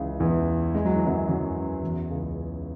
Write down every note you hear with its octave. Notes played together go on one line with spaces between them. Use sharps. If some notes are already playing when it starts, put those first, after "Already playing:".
Already playing: C#2 C#3 E3
E2 E3
G#3
F#3
E3
F#2 F#3
F#2 F#3
E2 E3
C#2 C#3